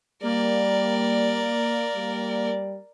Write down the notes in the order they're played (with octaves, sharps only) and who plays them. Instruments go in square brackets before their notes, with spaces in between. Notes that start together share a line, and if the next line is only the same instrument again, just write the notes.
[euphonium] G3 [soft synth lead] A#3 [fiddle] A#4 D5
[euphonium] G3